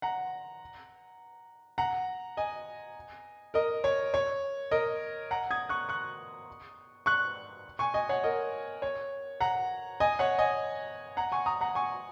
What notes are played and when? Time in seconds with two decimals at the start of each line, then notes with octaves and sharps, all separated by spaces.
0.02 F#5 A#5
1.78 F#5 A#5
2.37 D#5 G#5
3.54 A#4 D#5
3.84 C#5
4.14 C#5
4.71 A#4 D#5
5.31 F#5 A#5
5.51 D#6 G#6
5.69 C#6 F#6
5.89 C#6 F#6
7.06 C#6 F#6
7.79 G#5 C#6
7.94 D#5 G#5
8.09 C#5 F#5
8.24 A#4 D#5
8.82 C#5
9.40 F#5 A#5
10.00 D#5 G#5
10.19 C#5 F#5
10.39 D#5 G#5
11.17 F#5 A#5
11.32 G#5 C#6
11.46 A#5 D#6
11.61 F#5 A#5
11.75 G#5 C#6